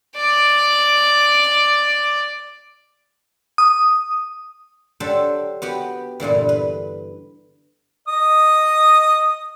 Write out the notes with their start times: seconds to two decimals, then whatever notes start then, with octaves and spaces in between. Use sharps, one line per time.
0.17 D5 D6
3.58 D#6
5.00 F#3 D4 G4 A4 C5
5.62 B3 F#4 G4
6.20 G2 A#2 D3 E3
6.49 B4
8.08 D#5 D#6